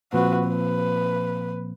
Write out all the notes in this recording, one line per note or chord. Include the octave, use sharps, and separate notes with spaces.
A#2 F3 C4 F#4 B4
B4